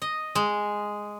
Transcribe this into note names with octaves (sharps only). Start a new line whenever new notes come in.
D#5
G#3